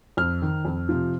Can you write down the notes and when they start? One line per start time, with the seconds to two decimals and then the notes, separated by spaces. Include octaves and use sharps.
0.17 F2 F6
0.42 D#3
0.65 F2
0.89 C3 F3